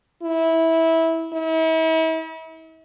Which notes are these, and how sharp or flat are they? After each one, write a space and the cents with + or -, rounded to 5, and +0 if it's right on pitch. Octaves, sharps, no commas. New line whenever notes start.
E4 -15
E4 -40